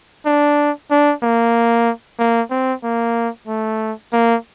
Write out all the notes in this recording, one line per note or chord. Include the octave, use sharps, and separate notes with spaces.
D4
D4
A#3
A#3
C4
A#3
A3
A#3